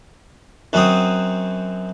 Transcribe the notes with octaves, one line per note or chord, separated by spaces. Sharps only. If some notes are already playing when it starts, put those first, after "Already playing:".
F#2 F#3 C4 D#6